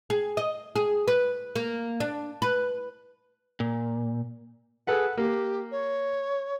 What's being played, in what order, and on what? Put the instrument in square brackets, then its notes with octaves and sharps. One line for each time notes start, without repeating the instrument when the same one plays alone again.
[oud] G#4
D#5
G#4
B4
A#3
D4
B4
[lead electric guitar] A#2
[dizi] G#4 [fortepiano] A4 B4 F#5
[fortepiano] A#3 [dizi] G4
[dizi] C#5